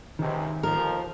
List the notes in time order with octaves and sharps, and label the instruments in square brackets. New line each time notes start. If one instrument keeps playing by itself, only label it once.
[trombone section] C#2 G#2 C3 [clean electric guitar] D#3
[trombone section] D#2 F3 [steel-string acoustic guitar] A#4